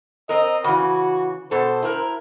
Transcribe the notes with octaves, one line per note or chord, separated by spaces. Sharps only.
C4 A#4 D#5
C#3 E3 F#4
B2 A4 C5
E4 A#4